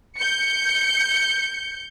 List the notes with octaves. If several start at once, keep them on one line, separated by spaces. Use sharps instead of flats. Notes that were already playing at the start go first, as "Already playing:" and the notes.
G6 C#7